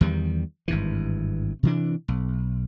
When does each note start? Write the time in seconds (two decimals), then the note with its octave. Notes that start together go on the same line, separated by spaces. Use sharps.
0.01 E2 D#3 G3
0.68 G#1 G2 E3
1.63 C3 E3 D4
2.08 B1